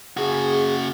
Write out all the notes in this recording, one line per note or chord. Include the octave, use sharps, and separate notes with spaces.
C#3 F#4 G#4